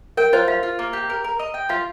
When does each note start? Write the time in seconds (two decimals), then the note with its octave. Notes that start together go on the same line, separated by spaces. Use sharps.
0.17 A#4 G5
0.33 F4 C5
0.47 F4 F5
0.63 F4
0.79 A#3
0.93 G4
1.10 A#4
1.24 A#4
1.39 D#5
1.54 G5
1.69 F4 F5